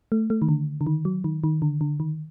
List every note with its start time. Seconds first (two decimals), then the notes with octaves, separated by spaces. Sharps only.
0.12 A3
0.30 A3
0.42 D#3
0.48 D3
0.81 D3
0.87 D#3
1.05 F#3
1.24 D#3
1.44 D#3
1.62 D3
1.81 D3
2.00 D#3